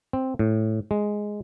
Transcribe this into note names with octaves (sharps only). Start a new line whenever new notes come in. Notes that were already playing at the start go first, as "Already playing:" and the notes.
C4
A2
G#3